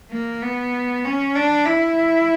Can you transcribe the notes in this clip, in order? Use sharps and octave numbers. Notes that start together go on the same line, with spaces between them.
A#3
B3
C#4
D4
E4